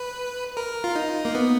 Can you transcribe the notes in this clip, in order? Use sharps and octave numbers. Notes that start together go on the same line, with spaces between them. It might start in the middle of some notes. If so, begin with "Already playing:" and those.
Already playing: B4
A#4
F4
D#4
A#3
B3